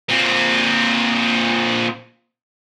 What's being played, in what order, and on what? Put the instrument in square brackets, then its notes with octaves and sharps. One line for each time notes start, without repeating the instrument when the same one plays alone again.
[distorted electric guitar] A#2 C4